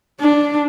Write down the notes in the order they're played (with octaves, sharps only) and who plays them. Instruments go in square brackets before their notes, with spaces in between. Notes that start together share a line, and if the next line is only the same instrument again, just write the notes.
[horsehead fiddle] D4